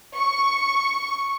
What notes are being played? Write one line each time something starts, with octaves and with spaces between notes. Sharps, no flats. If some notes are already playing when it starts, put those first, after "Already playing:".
C#6